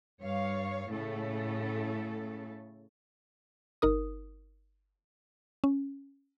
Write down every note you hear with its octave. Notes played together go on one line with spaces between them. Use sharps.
G2 C#5 F5
A2 C#3 A3 A4
G1 D#4 A#4 D#6
C#4